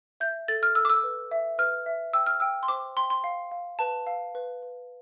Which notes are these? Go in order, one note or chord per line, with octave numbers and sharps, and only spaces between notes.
E5 G6
A4 A6
F6
A4 E6
D6
E6
B4
E5
B4 F6
E5
G5 E6
F6
G5 E6
C6
C5 D6
G5 C6
C6
F5
F5
B4 A5
F5
B4
B4